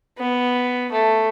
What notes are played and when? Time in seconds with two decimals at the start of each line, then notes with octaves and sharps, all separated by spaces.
0.18 B3
0.92 A3